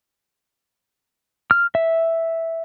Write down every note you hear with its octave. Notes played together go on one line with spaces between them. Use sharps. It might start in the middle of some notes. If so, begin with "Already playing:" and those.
F6
E5